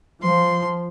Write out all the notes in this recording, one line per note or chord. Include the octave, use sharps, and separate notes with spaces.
F3 C6